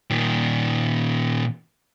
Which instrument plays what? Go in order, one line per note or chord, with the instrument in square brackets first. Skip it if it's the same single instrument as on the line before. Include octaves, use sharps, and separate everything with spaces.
[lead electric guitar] A#2 D#3